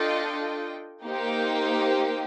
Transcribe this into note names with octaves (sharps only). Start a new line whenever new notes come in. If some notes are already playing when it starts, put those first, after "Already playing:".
Already playing: D4 F4 A4 D#5 G5
A#3 D#4 G4 C5 G5